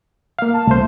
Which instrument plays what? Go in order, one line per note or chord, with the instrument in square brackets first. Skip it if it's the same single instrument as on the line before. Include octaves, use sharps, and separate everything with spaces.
[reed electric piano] A#3 F5
[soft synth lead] A5
[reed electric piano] C2 C5 [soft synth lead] A3